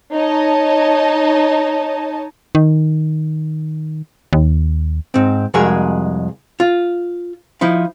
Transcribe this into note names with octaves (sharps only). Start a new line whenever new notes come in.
D#4 C#5 D#5 A5
D#3
D#2
G#2 C4
C2 F2 G#3 F#4 G#4 A#4
F4
F3 D#4 E4